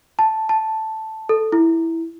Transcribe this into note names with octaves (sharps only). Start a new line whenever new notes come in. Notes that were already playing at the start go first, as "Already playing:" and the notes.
A5
A5
A4
E4